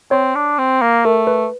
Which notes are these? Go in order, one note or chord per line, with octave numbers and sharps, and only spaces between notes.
C4 C#5
D4
C4
A#3
A3 A#4
B4